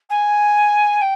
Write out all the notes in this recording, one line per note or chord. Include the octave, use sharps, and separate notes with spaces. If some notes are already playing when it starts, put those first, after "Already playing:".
G#5
G5